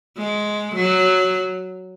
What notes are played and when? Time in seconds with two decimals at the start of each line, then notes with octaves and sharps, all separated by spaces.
0.17 G#3
0.76 F#3